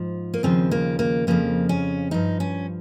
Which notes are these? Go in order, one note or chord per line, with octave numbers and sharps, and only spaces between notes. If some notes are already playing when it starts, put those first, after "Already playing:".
Already playing: G#2 F3
A#3
D#2 C#3 F3 C4
A#3
A#3
F2 C#3 F3 A#3
C#4
G2 F3 D#4
C#4